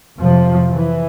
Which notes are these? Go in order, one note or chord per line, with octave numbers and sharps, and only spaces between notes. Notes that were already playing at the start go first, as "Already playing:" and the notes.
F2 C3 F3
E3